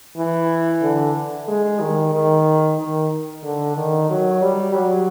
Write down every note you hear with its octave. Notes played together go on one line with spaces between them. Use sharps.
E3
D3
G#3
D#3
D#3
D#3
D3
D#3
F#3
G3
F#3